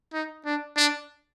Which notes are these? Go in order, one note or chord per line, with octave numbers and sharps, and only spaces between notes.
D#4
D4
D4